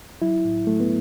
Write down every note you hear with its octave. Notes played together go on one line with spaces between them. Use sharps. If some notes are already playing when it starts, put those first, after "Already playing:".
F#3 E4
A2
F#3 A3
B3